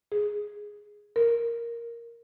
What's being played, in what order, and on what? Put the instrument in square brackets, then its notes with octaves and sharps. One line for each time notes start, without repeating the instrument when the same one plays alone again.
[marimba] G#4
A#4